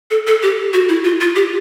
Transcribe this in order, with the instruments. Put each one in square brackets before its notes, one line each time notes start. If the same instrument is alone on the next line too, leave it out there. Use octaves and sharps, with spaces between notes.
[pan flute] A4
A4
G4
F#4
E4
F4
F4
G4